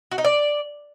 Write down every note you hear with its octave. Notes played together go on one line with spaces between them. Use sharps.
F#4
D#4
D5